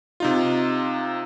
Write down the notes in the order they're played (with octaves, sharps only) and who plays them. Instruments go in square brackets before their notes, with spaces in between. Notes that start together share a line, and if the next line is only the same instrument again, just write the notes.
[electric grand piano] C3 D#4 F4